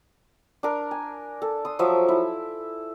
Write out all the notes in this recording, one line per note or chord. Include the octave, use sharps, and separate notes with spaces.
D4 A#4
G#5
A4
C6 D#6
F3 F#3 E5 D6
E4